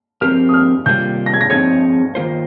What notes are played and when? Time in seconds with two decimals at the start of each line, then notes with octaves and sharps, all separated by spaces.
0.21 F3 C4 G4 A#4 F6
0.49 D#6
0.54 F6
0.86 C3 D#3 G3 A#3 F4 G6
1.26 A#6
1.34 G#6
1.41 A#6
1.50 F3 C4 D#4 G#4 C#5 G#6
2.15 D#3 A#3 F4 C5